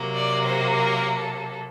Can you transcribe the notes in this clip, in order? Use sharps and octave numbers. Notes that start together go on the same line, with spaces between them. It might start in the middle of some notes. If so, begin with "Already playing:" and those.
Already playing: C3 F#3 A#3
D5
C5
A#4
A4